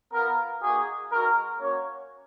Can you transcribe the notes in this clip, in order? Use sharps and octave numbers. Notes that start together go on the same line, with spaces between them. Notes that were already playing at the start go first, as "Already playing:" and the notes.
B3 F4 A#4
A#3 D#4 F#4 G#4
G#3 D#4 F#4 A#4
A#3 C#4 F#4 C#5